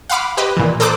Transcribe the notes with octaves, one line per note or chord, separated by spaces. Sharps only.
F5 F#5 B5 D6 F6
G4 B4 D#5
A#2 E3
A4 C5 A#5 D6 D#6 F#6